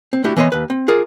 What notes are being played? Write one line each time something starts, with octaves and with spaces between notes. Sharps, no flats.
C4
A3 D4 E4 F#4 G4
E3 B3 C#5 D#5 C6
D#2 B4
C4
F4 G#4 A#4 D5